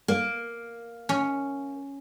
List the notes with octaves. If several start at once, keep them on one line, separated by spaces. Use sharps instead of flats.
A#3
C#4